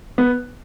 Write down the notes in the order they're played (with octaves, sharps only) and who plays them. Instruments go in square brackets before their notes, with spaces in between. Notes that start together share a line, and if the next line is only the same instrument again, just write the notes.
[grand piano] B3